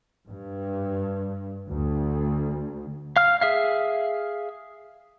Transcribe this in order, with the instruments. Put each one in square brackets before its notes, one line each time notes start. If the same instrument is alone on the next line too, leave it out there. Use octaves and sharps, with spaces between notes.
[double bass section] G2
D2
[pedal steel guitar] F5 F6
G#4 E5 F5